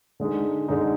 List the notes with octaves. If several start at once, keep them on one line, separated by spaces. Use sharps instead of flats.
D3 G#3 D#4
D3 G#3 D#4